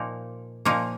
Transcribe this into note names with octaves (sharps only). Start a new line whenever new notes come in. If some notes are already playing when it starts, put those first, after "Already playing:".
Already playing: A#2 F3 A#3 D#4
A#2 F3 A#3 D#4